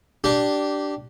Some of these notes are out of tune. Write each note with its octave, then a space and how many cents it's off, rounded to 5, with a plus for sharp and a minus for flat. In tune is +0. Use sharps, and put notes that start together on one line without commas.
D4 +0 G4 -15